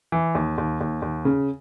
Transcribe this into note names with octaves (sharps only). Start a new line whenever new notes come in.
E3
D#2
D#2
D#2
D#2
C#3